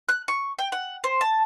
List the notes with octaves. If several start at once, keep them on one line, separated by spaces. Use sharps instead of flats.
F#6
C#6
G5
F#5
C5
A5